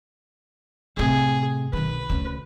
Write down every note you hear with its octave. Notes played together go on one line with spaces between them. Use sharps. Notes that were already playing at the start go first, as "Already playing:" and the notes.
A2 C3 G#4
B1 D#3 B4
D2 C#3